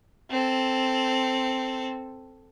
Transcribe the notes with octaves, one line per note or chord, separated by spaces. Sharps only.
C4 A4